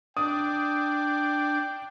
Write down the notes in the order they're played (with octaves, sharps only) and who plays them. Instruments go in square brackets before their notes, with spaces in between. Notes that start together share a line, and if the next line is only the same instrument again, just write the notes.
[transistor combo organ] D4 [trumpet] G5 [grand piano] D#6